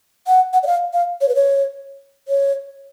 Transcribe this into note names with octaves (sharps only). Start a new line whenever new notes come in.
F#5
F#5
D5
F5
F5
C#5
B4
C#5
C#5